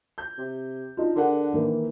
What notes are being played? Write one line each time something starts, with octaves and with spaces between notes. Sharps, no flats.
G6
C3
D4 D#4 F4
D3 G#4 A#4 F#5
D#3 E3 A#3